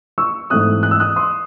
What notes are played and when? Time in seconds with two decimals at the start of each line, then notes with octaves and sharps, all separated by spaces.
0.18 C#6 E6
0.50 G#2 E3 A3 C4 D#6 F#6
0.83 F#6
0.91 E6
1.00 D#6 F#6
1.16 C6 D#6